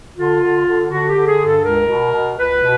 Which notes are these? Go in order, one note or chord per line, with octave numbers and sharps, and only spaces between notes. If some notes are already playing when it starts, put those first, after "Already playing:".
D3 F4
D3
D3
D3 F#4
G4
D3
G#4
G2
A4
C#2 A#4
B2
B2
C#2 B4
B2